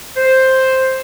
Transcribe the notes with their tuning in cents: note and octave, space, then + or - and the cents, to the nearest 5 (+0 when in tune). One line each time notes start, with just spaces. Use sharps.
C5 +5